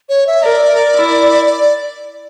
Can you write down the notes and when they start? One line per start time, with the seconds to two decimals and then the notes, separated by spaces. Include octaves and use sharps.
0.09 C#5
0.27 E5
0.43 A#4 D5
0.95 E4
1.46 D5